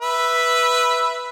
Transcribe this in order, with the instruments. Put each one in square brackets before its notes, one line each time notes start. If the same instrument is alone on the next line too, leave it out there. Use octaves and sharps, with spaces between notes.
[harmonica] B4 E5